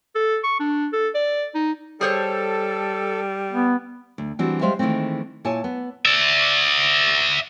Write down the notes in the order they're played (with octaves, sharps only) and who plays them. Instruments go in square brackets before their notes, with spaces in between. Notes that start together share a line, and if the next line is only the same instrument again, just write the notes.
[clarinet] A4
C#6
D4
A4
D5
D#4
[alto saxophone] G3 [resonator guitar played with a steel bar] G#4 C5 C#5 [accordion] A4
[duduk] B3
[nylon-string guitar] D2
E3 G3 C4 D4 F#4
G3 G#3 C5 E5 F5
D#3 E3 F#3 G#3 A3 C4
A#2 E4 C#5 G#5 A5
B3
[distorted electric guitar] D5 E5